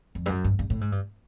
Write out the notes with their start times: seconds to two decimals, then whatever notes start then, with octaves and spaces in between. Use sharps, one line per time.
0.15 F2
0.26 G2
0.30 F#2
0.44 G2
0.59 G2
0.70 A2
0.81 G#2
0.92 G2